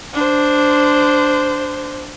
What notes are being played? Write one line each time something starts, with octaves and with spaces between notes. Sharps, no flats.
D4 C5